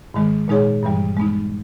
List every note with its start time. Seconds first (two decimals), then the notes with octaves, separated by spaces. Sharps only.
0.14 G#2 D#3 G#3
0.48 A#2 G#3 D#4 G#4 C#5
0.83 G2 E3 G3
1.17 G#3 B3 D#4